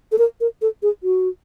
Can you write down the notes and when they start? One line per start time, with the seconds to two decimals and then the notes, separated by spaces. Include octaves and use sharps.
0.12 A4
0.18 A#4
0.41 A#4
0.62 A4
0.83 G#4
1.03 F#4